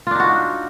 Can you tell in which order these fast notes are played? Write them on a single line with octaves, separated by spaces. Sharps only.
F4 D4 D#4 F#4